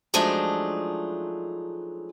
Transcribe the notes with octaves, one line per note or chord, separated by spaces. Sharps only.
F3 F#3 G#3 A3 D4 D#4